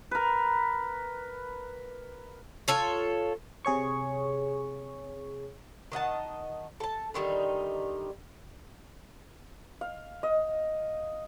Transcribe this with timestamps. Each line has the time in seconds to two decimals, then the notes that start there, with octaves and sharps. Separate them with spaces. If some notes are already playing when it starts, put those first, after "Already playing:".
0.11 A#4 B4
2.68 F4 A4 C#5
3.65 C3 G#4 C#5 C#6
5.92 D#3 D#5 F#5 A5
6.80 A4 A5
7.14 D3 D#3 G3 D#4
9.81 F5
10.23 D#5